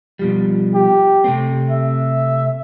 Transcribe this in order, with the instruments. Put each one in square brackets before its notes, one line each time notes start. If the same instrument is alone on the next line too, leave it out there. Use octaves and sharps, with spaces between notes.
[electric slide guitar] B2 F3 G3
[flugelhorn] G4
[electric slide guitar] C3 A3 C4
[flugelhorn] E5